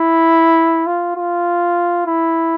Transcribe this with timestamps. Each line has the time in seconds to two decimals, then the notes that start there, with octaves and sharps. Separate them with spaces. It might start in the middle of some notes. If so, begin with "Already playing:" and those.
Already playing: E4
0.86 F4
1.17 F4
2.07 E4